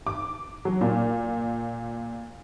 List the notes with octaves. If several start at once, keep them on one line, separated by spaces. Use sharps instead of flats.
D6
F#3
A#2